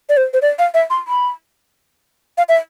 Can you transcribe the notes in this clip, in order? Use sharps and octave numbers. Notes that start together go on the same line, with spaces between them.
D5
C5
C5
D5
F5
E5
C6
B5
F5
E5